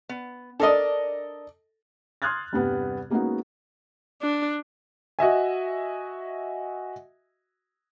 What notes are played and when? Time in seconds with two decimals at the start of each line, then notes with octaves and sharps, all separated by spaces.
0.09 B3
0.60 D4 A4 A#4 D5 D#5
2.22 C6 D#6 F6 F#6 G#6 A6
2.52 E2 G2 C3 G3 B3
3.10 G#3 A#3 B3 C#4 D#4 F#4
4.22 D4
5.19 F#4 D#5 E5 G#5